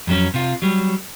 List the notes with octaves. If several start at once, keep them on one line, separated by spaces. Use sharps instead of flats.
F2 F#3 C#4
C3 F4
F#3 G3